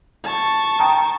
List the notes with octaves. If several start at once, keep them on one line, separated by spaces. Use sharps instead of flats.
A5 C#6
G5 A#5 D#6